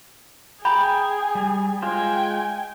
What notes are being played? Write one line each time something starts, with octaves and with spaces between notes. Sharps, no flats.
G#4 G5 A#5 B5
G3
G#3 F4 C5 G5 G#5